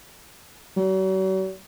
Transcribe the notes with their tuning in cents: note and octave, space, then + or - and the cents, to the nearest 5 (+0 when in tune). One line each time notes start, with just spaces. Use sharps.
F#3 +45